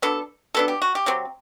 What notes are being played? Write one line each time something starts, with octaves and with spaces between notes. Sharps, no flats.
F#3 B3 D4 A4
F#3 B3 D4 A4
G4
F#4
G4
C3 F#3 C4